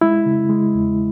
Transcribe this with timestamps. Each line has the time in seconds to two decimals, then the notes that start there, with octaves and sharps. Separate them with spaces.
0.01 G#3 E4
0.26 C#3
0.49 G#3
0.74 E2